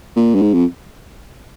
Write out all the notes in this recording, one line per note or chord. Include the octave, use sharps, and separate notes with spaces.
A#2
G2
G#2
F2